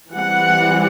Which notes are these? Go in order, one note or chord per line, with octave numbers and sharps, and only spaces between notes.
E3 G3 C4 F#5